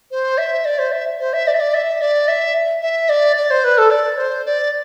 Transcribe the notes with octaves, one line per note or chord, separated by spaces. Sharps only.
C5
E5
D5
C5
E5
C5
E5
D5
E5
D5
E5
D5
E5
E5
D5
D5
C5
B4
A4
D5
C5
D5